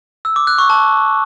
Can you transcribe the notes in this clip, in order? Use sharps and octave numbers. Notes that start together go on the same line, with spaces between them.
E6
D6
F#6
C#6
A5